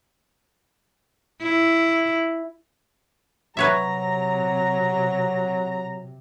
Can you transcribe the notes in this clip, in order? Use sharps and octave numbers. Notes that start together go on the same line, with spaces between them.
E4
C3 F#3 B4 C#5 E5 A#5